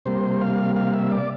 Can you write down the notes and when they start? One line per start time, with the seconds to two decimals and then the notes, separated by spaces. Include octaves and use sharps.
0.06 C3 G3 A#3 C5
0.41 F5
0.76 F5
0.94 E5
1.11 D5